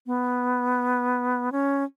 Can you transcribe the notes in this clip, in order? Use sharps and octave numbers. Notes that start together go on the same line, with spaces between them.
B3
C#4